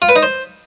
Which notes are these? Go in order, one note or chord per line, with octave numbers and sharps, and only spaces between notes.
F4
B4
D#4
C5